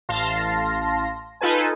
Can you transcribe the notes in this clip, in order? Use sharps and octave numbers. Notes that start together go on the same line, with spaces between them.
A1 F5 A5 C6 A#6
D#4 F4 A4 B4 G#5